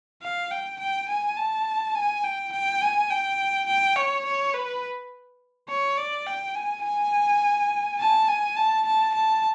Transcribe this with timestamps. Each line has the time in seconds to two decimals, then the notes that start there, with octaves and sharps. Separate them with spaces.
0.22 F5
0.51 G5
0.80 G5
1.09 G#5
1.37 A5
1.95 G#5
2.24 G5
2.53 G5
2.81 G#5
3.10 G5
3.67 G5
3.96 C#5
4.25 C#5
4.54 B4
5.68 C#5
5.97 D5
6.27 G5
6.55 G#5
6.84 G#5
7.99 A5
8.28 G#5
8.56 A5
8.86 A5
9.14 A5